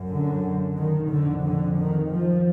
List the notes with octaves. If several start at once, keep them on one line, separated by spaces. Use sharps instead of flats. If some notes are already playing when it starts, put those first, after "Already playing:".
Already playing: F#2
D3
D#3
F2 D3
D3
D#3
F3